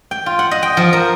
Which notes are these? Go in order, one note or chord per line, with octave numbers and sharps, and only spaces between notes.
G5
F4
F#5
D#5
G5
F3
A#4